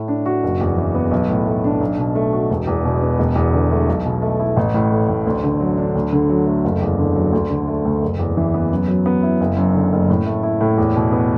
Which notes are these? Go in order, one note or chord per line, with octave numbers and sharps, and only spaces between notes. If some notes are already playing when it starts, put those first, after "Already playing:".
Already playing: A2 A3
D4
F#4
F#1
E2
E3
B3
B1
A2
A3
D4
B1
B2
A3
F#4
E1
E2
B2
B3
E1
E2
D3
A3
B1
B2
A3
E4
A1
A2
A3
A1
D2
D3
F#3
D4
D2
D3
F#3
A3
F#1
E2
D3
F#3
D2
D3
A3
D2
F#1
E2
E3
B3
F#2
F#3
B3
E4
F#1
F#2
D3
F#1
A2
A3
E4
A2
E2
B2
B3